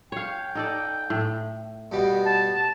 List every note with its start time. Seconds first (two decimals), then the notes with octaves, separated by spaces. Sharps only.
0.12 C#5 F5 G5
0.55 D#4 A4 D5
1.10 A2
1.92 G2 B2 G3 B3
2.25 A5